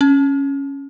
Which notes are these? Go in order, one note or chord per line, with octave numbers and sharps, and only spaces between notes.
C#4